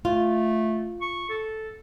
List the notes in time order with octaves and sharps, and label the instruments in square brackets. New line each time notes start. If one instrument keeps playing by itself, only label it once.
[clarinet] A3 [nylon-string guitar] F4
[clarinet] C#6
A4